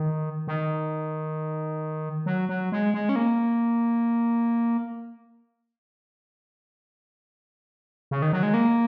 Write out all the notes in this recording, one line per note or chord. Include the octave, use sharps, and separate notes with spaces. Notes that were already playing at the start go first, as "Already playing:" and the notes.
Already playing: D#3
D#3
F#3
F#3
G#3
G#3
C#4
A#3
C#3
D#3
F#3
G#3
A#3